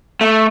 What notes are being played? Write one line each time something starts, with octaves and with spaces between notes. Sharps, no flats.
A3